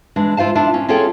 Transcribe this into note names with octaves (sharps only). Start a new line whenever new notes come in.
E3 G#3 D4
E4 F4 C5 F5 A5
D4 E4 F4
C#4
C#4 F4 G#4 A4 C#5 G5